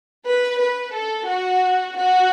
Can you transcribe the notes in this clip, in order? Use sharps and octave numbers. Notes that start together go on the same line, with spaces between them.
B4
B4
A4
F#4
F#4